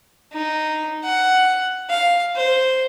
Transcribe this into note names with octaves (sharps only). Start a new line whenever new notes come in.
D#4
F#5
F5
C5